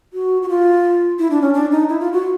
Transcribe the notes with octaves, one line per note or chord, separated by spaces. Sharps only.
F#4
F#4
F4
E4
D4
C#4
D4
D#4
E4
F4
F#4